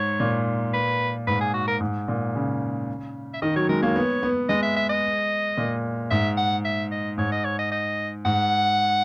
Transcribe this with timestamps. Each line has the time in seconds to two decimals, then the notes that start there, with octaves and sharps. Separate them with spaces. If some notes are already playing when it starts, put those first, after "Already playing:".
Already playing: G#2 C#5
0.20 A#2
0.74 B4
1.27 G#2 B4
1.41 G#4
1.54 F#4
1.68 A#4
1.80 G#2
2.08 A#2
2.35 C#3
3.34 E5
3.42 D#3 D#5
3.56 F#3 C#5
3.69 G#3 A#4
3.82 A#3 C#5
3.96 B3
4.23 B3
4.49 G#3 D#5
4.62 E5
4.76 E5
4.89 D#5
5.57 A#2
6.11 G#2 E5
6.37 F#5
6.65 E5
6.92 D#5
7.18 G#2 C#5
7.32 D#5
7.45 C#5
7.59 D#5
7.72 D#5
8.25 G#2 F#5